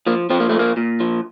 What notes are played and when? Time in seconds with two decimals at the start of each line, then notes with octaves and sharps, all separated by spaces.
0.07 F3 A#3
0.30 F3 C4
0.40 A#3
0.49 A#2 A3
0.59 A#3
0.77 A#2
1.00 F3